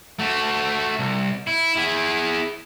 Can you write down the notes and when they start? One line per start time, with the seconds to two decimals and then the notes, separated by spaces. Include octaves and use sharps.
0.19 A3 F#4
0.99 C2
1.47 E4
1.76 E4 G#4